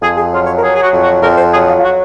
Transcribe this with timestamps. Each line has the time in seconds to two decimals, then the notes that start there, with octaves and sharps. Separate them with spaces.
0.01 F2 G#4
0.17 G#4
0.31 F#3 F4
0.46 C#5
0.57 A#4
0.62 F#3 G#4
0.75 G#4
0.82 F#4
0.92 F2
1.02 F#4
1.22 F2 A#4
1.38 C5
1.52 F#3 G#4
1.68 F4
1.78 F4
1.83 F#4